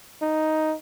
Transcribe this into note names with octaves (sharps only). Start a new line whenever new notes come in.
D#4